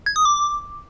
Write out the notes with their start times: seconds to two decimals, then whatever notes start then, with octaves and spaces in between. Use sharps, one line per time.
0.06 G#6
0.16 D#6
0.25 D6